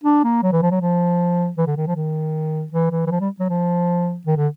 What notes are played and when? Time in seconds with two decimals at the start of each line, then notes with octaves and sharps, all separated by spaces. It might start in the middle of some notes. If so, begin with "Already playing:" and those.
0.04 D4
0.24 A#3
0.43 F#3
0.52 E3
0.62 F3
0.71 F#3
0.81 F3
1.58 E3
1.67 D3
1.77 D#3
1.87 F3
1.96 D#3
2.72 E3
2.91 E3
3.07 E3
3.11 F3
3.20 G3
3.40 F#3
3.49 F3
4.26 D#3
4.37 D3